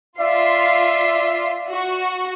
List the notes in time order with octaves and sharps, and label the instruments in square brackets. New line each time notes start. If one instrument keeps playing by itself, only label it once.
[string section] F4 C7 [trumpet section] D5 E5
[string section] F#4